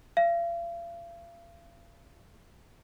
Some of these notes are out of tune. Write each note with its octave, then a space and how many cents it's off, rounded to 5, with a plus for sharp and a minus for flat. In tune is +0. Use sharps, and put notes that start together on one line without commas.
F5 -40